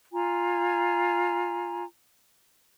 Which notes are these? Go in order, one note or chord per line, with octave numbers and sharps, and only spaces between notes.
F4 G#5 A#5